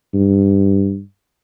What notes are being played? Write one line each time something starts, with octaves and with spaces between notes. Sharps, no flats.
G2